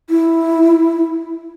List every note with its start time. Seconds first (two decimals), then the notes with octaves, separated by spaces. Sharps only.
0.10 E4